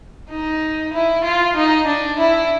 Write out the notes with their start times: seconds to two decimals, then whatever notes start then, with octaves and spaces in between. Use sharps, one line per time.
0.30 D#4
0.93 E4
1.24 F4
1.56 D#4
1.86 D4
2.19 E4